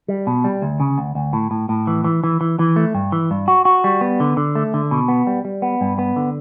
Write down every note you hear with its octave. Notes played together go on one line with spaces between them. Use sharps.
G3
B2
G3
D2
C#3
D2
D2
A2
A2
A2
E3
E3
E3
E3
E3
A3
G2
E3
G2
F#4
F#4
G3
B3
D3
D3
A3
D3
B2
B3
G3
G3
B3
G2
B3
D3